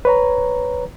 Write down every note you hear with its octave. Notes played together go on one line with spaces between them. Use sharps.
B4 C#5 A#5